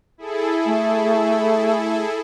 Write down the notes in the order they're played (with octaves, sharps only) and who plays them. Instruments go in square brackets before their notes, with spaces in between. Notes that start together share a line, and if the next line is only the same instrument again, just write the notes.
[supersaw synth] E4 G#4 A4
[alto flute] A3